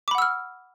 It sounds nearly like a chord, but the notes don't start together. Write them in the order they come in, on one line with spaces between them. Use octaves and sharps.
D6 B5 F#5 E6 F6